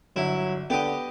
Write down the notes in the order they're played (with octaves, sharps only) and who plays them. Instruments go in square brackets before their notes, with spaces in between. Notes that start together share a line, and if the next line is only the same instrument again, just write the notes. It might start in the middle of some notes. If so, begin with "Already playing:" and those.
[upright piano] G1 [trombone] F#3 [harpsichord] E4
[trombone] D3 [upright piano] B3 [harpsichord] G4 D#5